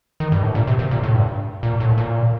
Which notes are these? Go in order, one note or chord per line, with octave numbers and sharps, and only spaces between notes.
D#3
G2
A2
A#2
C3
C3
A#2
A2
G2
A#2
A2
A#2